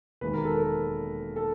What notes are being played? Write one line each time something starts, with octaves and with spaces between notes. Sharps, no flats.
E1 D#2 D#3 G#3 B4
A#4
A4
A#4
A4